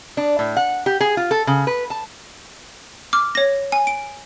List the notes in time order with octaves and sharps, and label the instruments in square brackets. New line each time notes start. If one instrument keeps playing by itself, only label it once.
[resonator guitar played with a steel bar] D4
A2
F#5
G4
G#4
F4
A4
C#3
B4
A5
[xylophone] D6 F6
C#5 A#6
G#5
D7